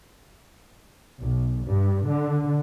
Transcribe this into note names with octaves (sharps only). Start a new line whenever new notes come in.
B1
G2
D3